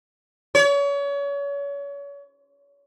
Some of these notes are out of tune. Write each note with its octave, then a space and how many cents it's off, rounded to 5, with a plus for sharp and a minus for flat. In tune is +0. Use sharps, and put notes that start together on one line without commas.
C#5 +35